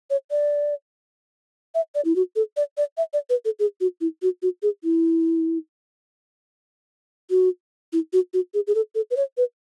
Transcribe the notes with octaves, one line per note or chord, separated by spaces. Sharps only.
C#5
D5
E5
D5
E4
F#4
A4
D5
D5
E5
D5
B4
A4
G#4
F#4
E4
F#4
F#4
G#4
E4
F#4
E4
F#4
F#4
G#4
G#4
A4
A4
B4
C#5
B4